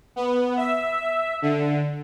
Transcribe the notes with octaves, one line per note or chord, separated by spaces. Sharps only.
B3
E5
D3